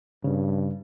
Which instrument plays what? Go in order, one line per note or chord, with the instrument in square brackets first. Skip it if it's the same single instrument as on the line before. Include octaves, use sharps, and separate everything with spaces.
[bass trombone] G2 [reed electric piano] C#3